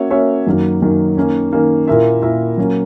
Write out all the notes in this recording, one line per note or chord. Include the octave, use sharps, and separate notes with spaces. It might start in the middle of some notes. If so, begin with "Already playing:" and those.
Already playing: A#3 C#4 F#4 C#5 E5
A#3 C#4 F#4 C#5 E5
F#2 D#3 F#3 A#3
F#2 D#3 F#3 A#3
D#3 A#3 C#4
D#3 A#3 C#4
A#2 A#3 E4 A#4 E5
A#2 A#3 E4 A#4 E5
F#3 A#3 C#4